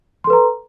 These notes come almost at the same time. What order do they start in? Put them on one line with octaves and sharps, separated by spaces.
C6 A4 B4 A#5